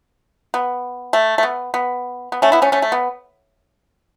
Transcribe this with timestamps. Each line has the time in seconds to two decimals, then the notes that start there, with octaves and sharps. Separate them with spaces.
0.54 B3
1.13 A3
1.38 A3
1.43 B3
1.74 B3
2.32 B3
2.42 A3 C#4
2.52 B3 E4
2.62 A3 C#4
2.72 A3 C#4
2.82 A3
2.92 B3